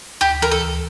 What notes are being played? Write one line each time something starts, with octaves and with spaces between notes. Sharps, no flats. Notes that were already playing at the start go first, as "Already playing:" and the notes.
D2 G4
E3 A#4
A4
D2